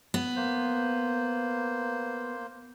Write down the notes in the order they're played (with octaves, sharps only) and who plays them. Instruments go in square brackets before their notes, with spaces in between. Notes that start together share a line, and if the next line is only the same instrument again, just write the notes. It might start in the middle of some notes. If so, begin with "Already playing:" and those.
[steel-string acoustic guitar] B3
[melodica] A#3 C5